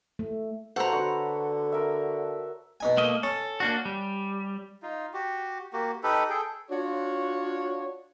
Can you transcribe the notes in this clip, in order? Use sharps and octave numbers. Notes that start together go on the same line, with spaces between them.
A3
B2 A4 C5 C#5 F#5 A#5
D3 F#4 B4
A#4 E5
B2 D#4 G#5
A3 A#3 D#5
C#4 A4
A#3 D4 F#4
G3
D#4 F4
F#4 G4
A#3 F#4 G4
D#4 G4 A4 B4
G#4 A4 G5
D4 F4 F#4 C#5